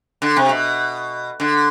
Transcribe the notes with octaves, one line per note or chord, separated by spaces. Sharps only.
D3
C3
B2
D3